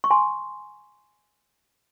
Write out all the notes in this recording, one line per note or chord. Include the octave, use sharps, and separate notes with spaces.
C#6
G#5 C6